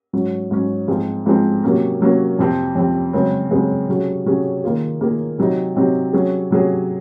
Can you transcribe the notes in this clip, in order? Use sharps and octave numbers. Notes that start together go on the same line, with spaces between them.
G#2 F#3 C#4
G#2 F#3 C#4
G#2 F3 G#3 C4 F4
G#2 F3 G#3 C4 F4
C3 F#3 A#3 C#4
C3 F#3 A#3 C#4
F2 C3 F3 C4
F2 C3 F3 C4
F#2 C#3 G#3 C4
F#2 C#3 G#3 C4
C3 F#3 C#4 G#4
C3 F#3 C#4 G#4
D#3 A#3 F4 G#4
D#3 A#3 F4 G#4
C3 F#3 C4 D#4
C3 F#3 C4 D#4
C3 F#3 C#4 G#4
C3 F#3 C#4 G#4